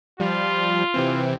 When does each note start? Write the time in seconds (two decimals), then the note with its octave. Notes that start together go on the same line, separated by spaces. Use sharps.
0.20 F3 G3 F4
0.94 C3 E3 C4